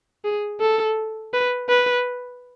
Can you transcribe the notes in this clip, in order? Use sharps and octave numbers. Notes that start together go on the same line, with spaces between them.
G#4
A4
B4
B4